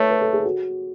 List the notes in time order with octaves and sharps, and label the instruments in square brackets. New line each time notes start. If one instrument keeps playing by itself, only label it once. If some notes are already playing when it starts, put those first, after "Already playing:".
Already playing: [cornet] A3 [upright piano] B4 C#5
[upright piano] B4
A4
G#4
F#4